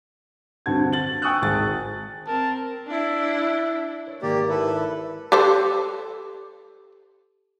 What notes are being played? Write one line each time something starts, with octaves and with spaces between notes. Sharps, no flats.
G2 D3 C4 F#4 A5 G#6
A6 F#7
G5 G#5 C#6 D#6 E6 F#6
G#1 G#4 A6
C4 A#4 A5
D4 E4
B4 C#5
G#1 A#3 G4 D5
E4 A4 B4
G4 A4 C5